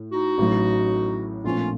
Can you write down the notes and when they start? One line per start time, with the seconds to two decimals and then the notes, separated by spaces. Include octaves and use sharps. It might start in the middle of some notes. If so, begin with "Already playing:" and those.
Already playing: A2
0.12 D#4 F#4
0.38 A1 A2 F#3
1.44 A#1 A#2 F3 A3 C4 C#4 F4